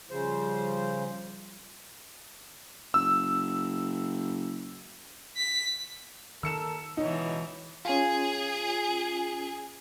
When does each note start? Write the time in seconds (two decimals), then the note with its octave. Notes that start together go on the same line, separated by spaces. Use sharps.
0.11 C#3 F3 G3 C5
2.94 F#1 E6
5.37 B6
6.43 D#2 D#3 A4 A#4 E6 C#7 E7
6.97 C#2 B2 E3 D#4 C#5
7.85 C#4 F4 G#4